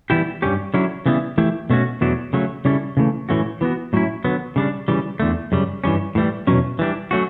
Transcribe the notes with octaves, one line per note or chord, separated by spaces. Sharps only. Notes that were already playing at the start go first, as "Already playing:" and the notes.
E3 G3 B3 E4 G4
G2 E3 G3 C#4 G4
D3 F#3 C#4 E4
C#3 E3 G3 B3 E4
E3 A3 E4 G4
B2 A3 C#4 F#4
E2 B2 F#3 A3 D4
C#3 F#3 A3
C#3 G3 C#4 E4 A4
C#3 E3 A3
A2 E3 A3 C#4 F#4
E3 B3 F#4
A2 F#3 C#4 E4
D3 F#3 B3
C#3 G3 D4
C#3 E3 G3
E2 D3 A3
F#2 C#3 G3
G2 E3 G3 C#4
A2 E3 G3
E2 B2 F#3 C#4
E3 G3 D4
F#3 A3 C#4 F#4